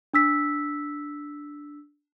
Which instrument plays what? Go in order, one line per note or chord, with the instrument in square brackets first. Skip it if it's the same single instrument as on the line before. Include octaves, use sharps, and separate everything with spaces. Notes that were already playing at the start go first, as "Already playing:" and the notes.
[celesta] D4 E6 B6